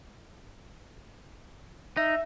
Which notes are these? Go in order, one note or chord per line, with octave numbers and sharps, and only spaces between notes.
D#4 E5